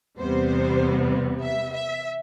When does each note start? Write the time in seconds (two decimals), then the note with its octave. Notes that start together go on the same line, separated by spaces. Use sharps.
0.19 E2 C3 G3 B3 C5
1.43 E5
1.73 E5